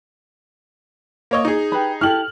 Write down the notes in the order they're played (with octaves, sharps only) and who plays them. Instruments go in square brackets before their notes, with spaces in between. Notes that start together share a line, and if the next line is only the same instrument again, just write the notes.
[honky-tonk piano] A#3 C#5 D#5
D#4 G#4
[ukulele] G4 B4 B5
[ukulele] E4 G4 A4 [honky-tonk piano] F6 F#7